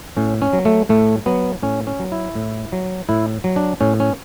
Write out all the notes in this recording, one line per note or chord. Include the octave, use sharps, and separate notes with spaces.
A2 C#4
C#4
F#3
A3
A2 A3
F#3 B3
A2 C#4
C#4
F#3
E4
A2
F#3
A2 E4
F#3
D4
A2 C#4
C#4